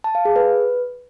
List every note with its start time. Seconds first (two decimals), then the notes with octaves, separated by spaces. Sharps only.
0.04 A5
0.15 F5
0.25 G#4
0.36 B4